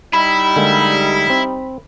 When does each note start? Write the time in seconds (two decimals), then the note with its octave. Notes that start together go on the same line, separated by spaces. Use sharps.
0.13 G3 D#4 E4 B5
0.56 D3 G#3 A#3
1.30 C4